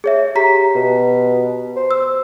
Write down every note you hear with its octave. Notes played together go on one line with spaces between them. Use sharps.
G#4 C#5 E5
G4 A#5 B6
B2
C5
E6